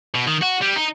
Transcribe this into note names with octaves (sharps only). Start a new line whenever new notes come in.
B2
D#3
F#4
G3
D#4